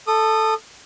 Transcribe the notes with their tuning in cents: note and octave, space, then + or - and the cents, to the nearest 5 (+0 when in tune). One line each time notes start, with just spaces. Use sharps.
A4 +0 D#6 -20